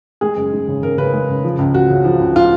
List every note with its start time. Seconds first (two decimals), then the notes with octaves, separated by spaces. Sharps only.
0.21 G#3 G#4
0.36 F#1
0.53 G#3
0.68 C#3
0.82 C#3 A#4
0.98 C#3 B4
1.13 G#3
1.29 C#3
1.44 F3
1.59 C#2
1.74 F3 F#4
1.90 C#3
2.05 F3
2.20 C#2
2.36 F4